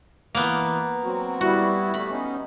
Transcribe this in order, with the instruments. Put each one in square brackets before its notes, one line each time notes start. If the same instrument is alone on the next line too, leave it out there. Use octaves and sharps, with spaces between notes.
[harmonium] E3 [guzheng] A#3 B3
[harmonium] F#3 C4 F#4
[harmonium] G3 B3 E4 [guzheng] F#4
[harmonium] G3 A3 [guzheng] B5
[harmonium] B3 C#4 D#4